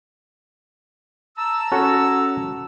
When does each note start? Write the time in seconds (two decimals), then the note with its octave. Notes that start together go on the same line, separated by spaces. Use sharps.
1.37 A5 A#5 E6
1.72 C#4 F#4 A4